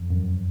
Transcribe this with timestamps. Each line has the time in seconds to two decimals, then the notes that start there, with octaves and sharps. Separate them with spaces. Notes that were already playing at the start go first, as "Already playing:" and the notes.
Already playing: F2
0.10 F#2